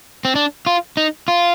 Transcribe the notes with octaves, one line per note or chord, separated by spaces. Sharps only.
C4
D4
F4
D#4
F4